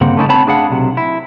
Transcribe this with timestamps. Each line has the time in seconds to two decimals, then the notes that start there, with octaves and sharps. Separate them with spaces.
0.01 G2 C#3 A#3 C4 F#5
0.17 A3 A#3 C#4 D#4 E4 A4
0.29 B3 C4 D#4 C#5 A5 B5
0.46 A3 D4 G#4 F5 F#5
0.70 B1 C3
0.97 E4